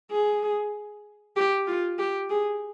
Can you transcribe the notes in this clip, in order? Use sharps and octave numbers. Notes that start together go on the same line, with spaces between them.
G#4
G4
F4
G4
G#4